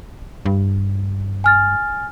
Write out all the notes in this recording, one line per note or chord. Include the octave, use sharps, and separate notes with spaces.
G2
G#5 F6 A6